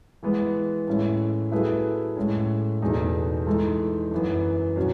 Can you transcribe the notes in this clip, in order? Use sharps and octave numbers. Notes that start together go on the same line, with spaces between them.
E3 G#3 B3
A2 G#3 C#4 E4
F#3 A3 E4 G#4 B4
A2 G#3 C#4
E2 B2 A3 D#4 G#4
E3 G#3 D#4 A4
F#2 E3 B3
B2 F#3 C#4